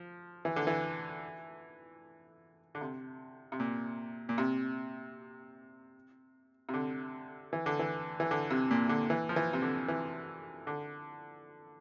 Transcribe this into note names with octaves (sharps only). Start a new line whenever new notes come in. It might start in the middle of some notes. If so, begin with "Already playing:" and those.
Already playing: F3
E3
D3
E3
D3
C3
C3
A#2
A#2
C3
C3
D3
E3
D3
E3
E3
D3
C3
A#2
D3
E3
F3
E3
C3
D3
E3
D3